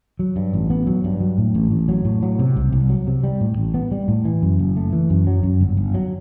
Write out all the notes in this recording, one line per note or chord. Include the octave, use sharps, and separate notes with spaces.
F#3
G2
A1
B3
F#3
G2
F#3
A2
A1
A1
F#3
A2
F#3
C3
C2
C2
F#3
C3
G3
A2
A1
B3
G3
A2
E3
F#2
F#1
A3
E3
F#2
F#3
F#2
G1
G1
F#3